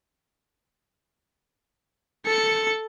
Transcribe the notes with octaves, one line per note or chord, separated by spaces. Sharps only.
A4 C#7